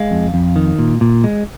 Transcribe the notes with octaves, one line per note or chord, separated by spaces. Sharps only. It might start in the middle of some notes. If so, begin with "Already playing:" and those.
Already playing: G#3 F5
F2
F2
D#3
A#2
A#2
G#3